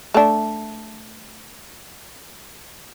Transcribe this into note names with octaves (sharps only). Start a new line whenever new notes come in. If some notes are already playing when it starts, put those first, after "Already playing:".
A3 D4